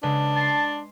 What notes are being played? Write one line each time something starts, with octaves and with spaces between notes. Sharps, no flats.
C#3 G#3 D4 B4
A5 C6 C7